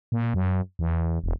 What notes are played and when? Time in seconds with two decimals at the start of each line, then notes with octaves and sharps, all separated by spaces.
0.12 A#2
0.34 F#2
0.79 E2
1.24 E1